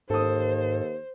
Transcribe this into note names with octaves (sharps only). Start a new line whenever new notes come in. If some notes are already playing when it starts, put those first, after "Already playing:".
D#2 G#2 A4 C5 D#6